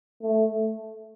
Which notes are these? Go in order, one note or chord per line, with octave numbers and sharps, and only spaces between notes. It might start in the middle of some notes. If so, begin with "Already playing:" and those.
A3